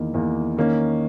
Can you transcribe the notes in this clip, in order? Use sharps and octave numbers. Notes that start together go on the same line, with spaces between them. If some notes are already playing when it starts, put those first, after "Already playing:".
Already playing: E2 D#3 A#3
E2 D#3 A#3
D#3 A#3 C#4